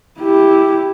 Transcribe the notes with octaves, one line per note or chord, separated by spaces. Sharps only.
E4 G4